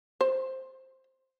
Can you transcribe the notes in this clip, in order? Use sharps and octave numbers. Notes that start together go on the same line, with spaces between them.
C5